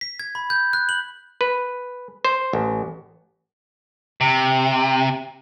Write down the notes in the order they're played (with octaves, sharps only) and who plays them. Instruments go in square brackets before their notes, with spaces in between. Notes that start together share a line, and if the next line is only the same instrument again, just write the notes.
[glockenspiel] B6
G#6
B5
G6
F#6
F#7
[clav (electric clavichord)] B4
C5
A1
[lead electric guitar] C3